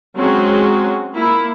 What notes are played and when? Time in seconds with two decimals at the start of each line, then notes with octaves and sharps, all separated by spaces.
0.18 F#3 G#3 C4 C#4 F#4
1.15 A#3 E4